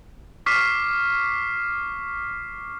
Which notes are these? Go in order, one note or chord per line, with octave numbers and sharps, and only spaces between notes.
C#6 D6 F6 B6 C7